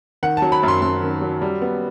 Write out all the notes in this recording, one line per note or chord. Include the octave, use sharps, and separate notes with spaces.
D#3 F#5
F#3 A5
B5
F#2 C6
F#2 C6
D#3
F#3
G3
B3